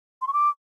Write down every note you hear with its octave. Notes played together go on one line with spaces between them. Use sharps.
C6
C#6
D6